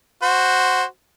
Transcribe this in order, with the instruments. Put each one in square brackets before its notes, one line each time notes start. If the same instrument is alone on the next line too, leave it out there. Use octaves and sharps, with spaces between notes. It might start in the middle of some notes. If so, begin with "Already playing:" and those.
[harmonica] F#4 C5